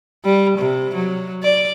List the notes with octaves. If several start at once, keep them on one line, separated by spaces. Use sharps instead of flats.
G3
C3
F#3
D5